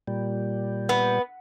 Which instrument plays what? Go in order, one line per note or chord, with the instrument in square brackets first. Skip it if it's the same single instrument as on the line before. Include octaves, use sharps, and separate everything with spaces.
[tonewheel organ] A#2 G3
[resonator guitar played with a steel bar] B3